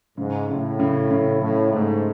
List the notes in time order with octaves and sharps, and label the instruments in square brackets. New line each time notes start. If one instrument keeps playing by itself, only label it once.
[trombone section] G#2 [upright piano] C#3
[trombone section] A2 [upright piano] C#3
[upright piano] C#3
C#3
[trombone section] A2 [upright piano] C#3
[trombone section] G#2 [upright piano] A3